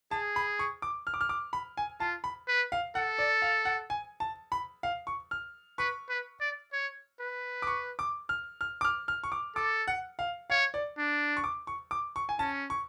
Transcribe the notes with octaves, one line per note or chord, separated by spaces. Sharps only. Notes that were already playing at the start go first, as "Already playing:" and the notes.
G#4 A5
B5
C#6
D6
F6
D6
F6
D6
B5
G#5
F4 A5
B5
B4
F5
A4 F#5
D5
F5
F#5
G#5
A5
B5
F5
C#6
F6
B4 C#6
B4
D5
C#5
B4
D6
C#6
D6
F6
F6
D6
F6
F6
C#6
D6
A4 D6
F#5
F5
C#5 F5
D5
D4
C#6
D6
C#6
D6
C#6
G#5
C#4 A5
C#6